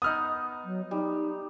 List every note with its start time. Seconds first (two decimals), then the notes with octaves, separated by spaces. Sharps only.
0.02 B3 D#4 D#6 F6
0.64 F#3
0.91 G3 D#4